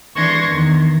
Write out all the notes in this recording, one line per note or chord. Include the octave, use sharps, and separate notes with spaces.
E3 D4 C6 C#6 G#6 A#6
E2 D#3